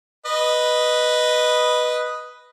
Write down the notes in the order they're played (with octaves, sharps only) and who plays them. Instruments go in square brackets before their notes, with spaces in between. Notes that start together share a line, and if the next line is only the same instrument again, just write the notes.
[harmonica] B4 D#5